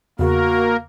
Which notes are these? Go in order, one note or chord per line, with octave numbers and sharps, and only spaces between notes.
E2 C#3 A#3 F#4 A#4